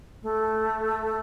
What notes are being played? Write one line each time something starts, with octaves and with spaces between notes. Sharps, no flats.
A3